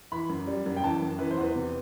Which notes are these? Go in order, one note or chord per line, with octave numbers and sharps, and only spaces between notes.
E3 B5
F#2
G3
F#2
G5
E3 A5
F#2
E3 B4
C5
E2 B4
C3